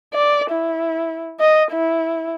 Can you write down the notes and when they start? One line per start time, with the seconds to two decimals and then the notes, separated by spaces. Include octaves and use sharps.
0.14 D5
0.51 E4
1.40 D#5
1.72 E4